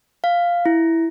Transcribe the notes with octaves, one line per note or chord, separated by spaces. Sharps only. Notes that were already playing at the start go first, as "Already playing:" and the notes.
F5
E4